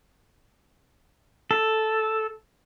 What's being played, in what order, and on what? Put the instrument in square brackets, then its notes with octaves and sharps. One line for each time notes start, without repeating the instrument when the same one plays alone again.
[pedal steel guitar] A4